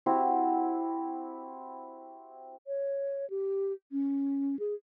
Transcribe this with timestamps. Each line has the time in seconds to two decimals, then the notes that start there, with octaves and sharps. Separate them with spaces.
0.06 C4 E4 F#4 G4
2.67 C#5
3.30 G4
3.92 C#4
4.59 G#4